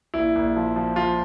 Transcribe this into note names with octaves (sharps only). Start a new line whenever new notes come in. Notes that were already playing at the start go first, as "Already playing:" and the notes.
A#1 E4
A#1
F3
F3
F3 F4